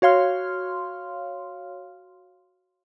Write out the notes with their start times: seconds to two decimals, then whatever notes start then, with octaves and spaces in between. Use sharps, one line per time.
0.02 F#4 C#5 F5 C6 F6